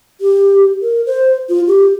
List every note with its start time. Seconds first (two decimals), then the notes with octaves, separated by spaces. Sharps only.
0.21 G4
0.82 A#4
1.06 C5
1.49 F4
1.67 G4